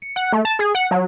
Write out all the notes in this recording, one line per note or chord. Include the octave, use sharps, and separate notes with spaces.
C#7
F#5
A3
A5
G#4
F#5
F#3